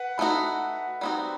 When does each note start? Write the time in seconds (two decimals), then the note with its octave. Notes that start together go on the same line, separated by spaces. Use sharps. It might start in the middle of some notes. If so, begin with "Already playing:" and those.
Already playing: B4 F#5
0.18 A3 D#4 F#4 B5
1.01 G3 C4 D#4 F#4